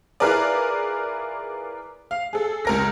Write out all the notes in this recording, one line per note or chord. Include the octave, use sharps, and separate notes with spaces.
E4 F4 G#4 A#4 B4 D5
F5
G#4 A4
C#2 A#4 A#6